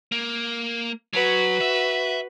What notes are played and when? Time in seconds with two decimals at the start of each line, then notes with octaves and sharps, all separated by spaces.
0.12 A#3
1.13 F#3 F#4 B4
1.61 E5